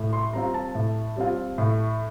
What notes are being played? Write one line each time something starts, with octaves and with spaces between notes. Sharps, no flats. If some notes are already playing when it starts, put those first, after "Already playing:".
Already playing: A2
C6
G3 C4 F4 A#5
A5
A2
G3 C4 F4
A2